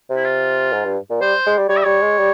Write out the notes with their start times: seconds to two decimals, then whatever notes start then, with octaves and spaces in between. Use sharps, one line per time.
0.10 C3
0.16 E4
0.25 F4
0.73 G#2
0.85 G2
1.10 A#2
1.21 G3 C5
1.46 G#3
1.58 G3
1.69 G3 C#5
1.77 E5
1.84 G3 C#5
2.02 G#3
2.19 G3